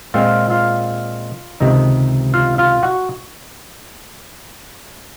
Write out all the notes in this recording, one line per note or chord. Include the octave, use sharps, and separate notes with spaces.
A#2 G#3 C4 F4 F5
F4 F5
C#2 C3 D#3 D#4 D#5
F4 F5
F4 F5
F#4 F#5